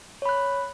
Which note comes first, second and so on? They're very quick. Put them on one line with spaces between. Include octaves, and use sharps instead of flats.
C#5 B5 F#6